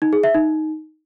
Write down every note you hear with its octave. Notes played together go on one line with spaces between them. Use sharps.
D#4
G#4
E5
D#4